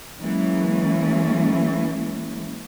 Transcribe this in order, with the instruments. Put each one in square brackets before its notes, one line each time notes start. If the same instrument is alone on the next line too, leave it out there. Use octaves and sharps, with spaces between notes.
[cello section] E3 F#3 G#3 A#3 C#4